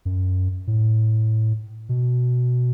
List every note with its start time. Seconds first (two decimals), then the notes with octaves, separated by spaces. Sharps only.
0.05 F#2
0.67 A2
1.89 B2